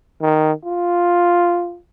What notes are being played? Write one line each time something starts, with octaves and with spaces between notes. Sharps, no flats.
D#3
F4